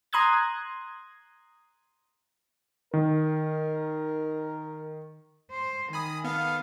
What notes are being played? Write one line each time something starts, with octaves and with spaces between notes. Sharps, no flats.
A#5 C6 D#6 F#6 G#6
D#3 A#4
C5
D#3 G#5 B5 D#6
B3 A4 B4 F5